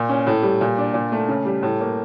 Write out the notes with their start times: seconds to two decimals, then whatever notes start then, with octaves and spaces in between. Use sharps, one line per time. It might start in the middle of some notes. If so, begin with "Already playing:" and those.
Already playing: A#2
0.09 C#4
0.27 A2
0.43 G3
0.61 A#2
0.78 D4
0.94 A#2
1.12 A3
1.29 C#3
1.45 G3
1.63 A2
1.80 A#3